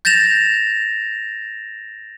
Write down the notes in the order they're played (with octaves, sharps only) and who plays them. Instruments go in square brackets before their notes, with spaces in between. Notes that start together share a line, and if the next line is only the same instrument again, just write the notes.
[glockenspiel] G6 A6 A#6 E7 F7